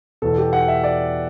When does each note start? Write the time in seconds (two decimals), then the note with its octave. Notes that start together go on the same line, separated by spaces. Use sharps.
0.22 E2 B2 A4
0.38 G4
0.53 F#5
0.68 E5
0.84 D5